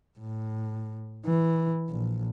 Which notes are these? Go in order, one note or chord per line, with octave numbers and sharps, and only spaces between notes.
A2
E3
A#1